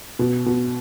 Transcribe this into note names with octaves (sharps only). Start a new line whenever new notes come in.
B2
B2